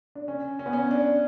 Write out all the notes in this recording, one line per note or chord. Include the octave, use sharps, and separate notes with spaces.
D4
C#4
C#4
B3
C#4
D4